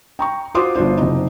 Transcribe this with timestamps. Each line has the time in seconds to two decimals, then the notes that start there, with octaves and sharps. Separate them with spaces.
0.19 G5 A#5 C#6
0.55 F4 F#4 C5 C6 D6 D#6
0.76 G1 D4 F4 C5
0.98 F#1 C3 D#4